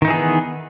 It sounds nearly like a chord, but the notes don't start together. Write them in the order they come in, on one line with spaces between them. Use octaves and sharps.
D#3 D#4 E3 G#4 B3